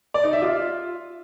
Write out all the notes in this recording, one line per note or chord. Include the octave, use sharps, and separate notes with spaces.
D5
D#4
E5
F4